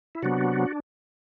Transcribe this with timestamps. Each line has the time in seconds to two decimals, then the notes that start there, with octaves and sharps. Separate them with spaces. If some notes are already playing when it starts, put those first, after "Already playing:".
0.15 E4
0.23 C3 F#3 B3 D4 F#4